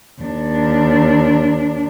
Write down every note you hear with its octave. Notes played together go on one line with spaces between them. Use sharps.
D#2 D4